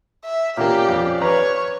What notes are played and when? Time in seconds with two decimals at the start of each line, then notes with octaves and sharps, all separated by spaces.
0.25 E5
0.57 A#2 A#3 C#4 G4 D5 F5
0.89 F2
1.22 B4 C#5 A#5